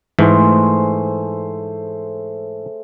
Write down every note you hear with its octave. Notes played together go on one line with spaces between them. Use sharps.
G#2 E3 A3 G#4 C5